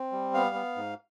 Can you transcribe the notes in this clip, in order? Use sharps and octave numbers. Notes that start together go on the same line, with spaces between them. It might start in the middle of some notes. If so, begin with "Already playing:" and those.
Already playing: C4
G3
B3 F5
B3
G#2